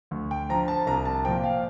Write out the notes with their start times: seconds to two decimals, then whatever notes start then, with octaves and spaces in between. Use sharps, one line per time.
0.11 D2
0.31 G5
0.49 D3 F3 A#5
0.68 A5
0.86 C2 A#5
1.05 A5
1.24 A#2 F3 G5
1.44 F5